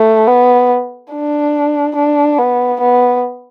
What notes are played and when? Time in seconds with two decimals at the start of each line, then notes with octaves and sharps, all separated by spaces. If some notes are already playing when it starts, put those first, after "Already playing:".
Already playing: A3
0.27 B3
1.12 D4
1.96 D4
2.38 B3
2.80 B3